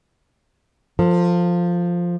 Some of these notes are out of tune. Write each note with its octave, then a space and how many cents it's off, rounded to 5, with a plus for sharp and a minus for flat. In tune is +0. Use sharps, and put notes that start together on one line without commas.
F3 +0 A4 +25